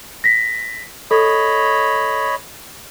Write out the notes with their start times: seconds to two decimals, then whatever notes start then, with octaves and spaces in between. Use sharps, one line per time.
0.24 A#6 B6
1.11 A4 C#5 D#5 B5